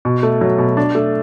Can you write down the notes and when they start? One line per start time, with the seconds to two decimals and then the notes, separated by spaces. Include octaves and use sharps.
0.05 B2
0.23 A3
0.41 F#3
0.58 B2
0.77 D4
0.95 A3